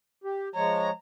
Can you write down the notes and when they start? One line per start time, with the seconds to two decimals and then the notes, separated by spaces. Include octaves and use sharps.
0.24 G4
0.55 F3 G#3 C#5 A#5